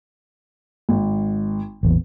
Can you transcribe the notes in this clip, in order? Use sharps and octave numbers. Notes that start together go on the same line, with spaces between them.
G#1
A1 E2 A#2